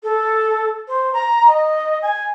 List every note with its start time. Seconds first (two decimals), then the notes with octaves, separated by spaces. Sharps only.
0.03 A4
0.87 C5
1.13 A#5
1.47 D#5
2.02 G#5